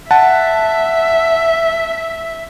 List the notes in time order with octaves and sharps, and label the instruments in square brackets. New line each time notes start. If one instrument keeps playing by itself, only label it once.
[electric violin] E5 [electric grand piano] F#5 A5